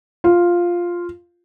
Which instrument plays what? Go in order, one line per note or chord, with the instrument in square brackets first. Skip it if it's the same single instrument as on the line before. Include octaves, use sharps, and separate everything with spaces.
[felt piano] F4